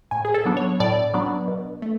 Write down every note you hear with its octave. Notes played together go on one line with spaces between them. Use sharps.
A2 G#5
G#4
A4
F#3 B3 D4
C#5
A2 D5
F#3 B3 D4
B2
A3